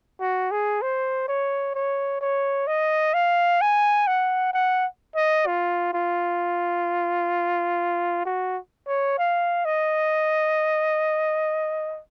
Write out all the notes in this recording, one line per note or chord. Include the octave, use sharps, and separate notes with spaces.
F#4
G#4
C5
C#5
C#5
C#5
D#5
F5
G#5
F#5
F#5
D#5
F4
F4
F#4
C#5
F5
D#5